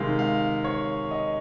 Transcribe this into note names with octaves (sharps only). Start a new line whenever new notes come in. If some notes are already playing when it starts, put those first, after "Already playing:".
Already playing: C3 D#3 G#3 F5
F5
C#5
D#5